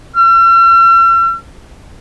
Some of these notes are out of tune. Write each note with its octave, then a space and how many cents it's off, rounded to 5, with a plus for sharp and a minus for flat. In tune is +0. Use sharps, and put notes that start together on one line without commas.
E6 +45